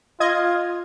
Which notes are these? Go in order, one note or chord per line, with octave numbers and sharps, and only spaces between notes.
F4 D#5 G#6